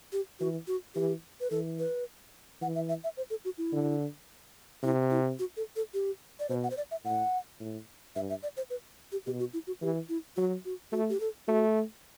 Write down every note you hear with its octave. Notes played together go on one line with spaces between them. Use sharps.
G4
E3 F#4
F#4
E3 G4
B4
E3 A4
B4
E3 F#5
E5
E5
E5
C5
A4
F#4
E4
D3
C3 E4
E4
F#4
A4
A4
G4
D5
B2 C5
F#5
C5
D5
E5
A2 F#5
A2
G2 E5
E5
D5
C5
B4
G4
B2 G4
F#4
E4
F#4
E3 G4
E4
F#3 F#4
F#4
A3 F#4
G4
A4
A3 F#4